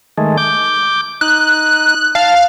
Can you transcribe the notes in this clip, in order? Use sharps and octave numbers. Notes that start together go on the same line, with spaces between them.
D#3 G#3 A3
D6 G6
D#4 F#6
F5 A5